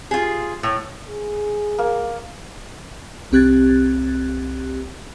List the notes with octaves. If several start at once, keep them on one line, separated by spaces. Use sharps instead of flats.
F4 G#4
A2
G#4
A#3
C2 C4 G4 F#6 G#6 A6